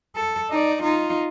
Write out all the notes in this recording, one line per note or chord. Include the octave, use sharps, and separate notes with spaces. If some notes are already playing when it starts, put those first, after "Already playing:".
A4
D#4 D5
D#4 F4